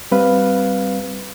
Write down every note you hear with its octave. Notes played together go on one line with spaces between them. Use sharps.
G3 C4 B4 F5